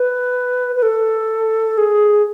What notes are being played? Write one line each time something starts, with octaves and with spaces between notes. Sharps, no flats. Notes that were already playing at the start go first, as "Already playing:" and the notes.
Already playing: B4
B4
A4
G#4